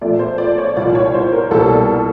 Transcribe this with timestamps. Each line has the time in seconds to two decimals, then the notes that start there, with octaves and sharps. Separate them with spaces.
0.01 A#2 F3 A3 D5
0.19 C5
0.38 D5
0.58 C#5
0.76 C2 A#2 F3 D5
0.95 C#5
1.14 C5
1.32 A#4
1.51 C2 B2 G3 A#3 A4